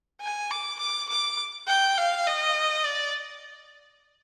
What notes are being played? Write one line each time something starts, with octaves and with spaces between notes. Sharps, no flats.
G#5
D6
D6
D6
G5
F5
D#5
D5